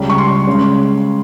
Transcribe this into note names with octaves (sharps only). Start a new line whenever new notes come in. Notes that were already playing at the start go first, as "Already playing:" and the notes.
Already playing: C#2 C#3 G3
C#6
C6
C#3 G#3 C#4